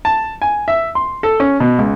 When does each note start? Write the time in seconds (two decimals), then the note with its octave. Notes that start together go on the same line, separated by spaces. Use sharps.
0.05 A5
0.42 G#5
0.68 E5
0.95 C6
1.23 A4
1.40 C#4
1.60 B2
1.79 C#2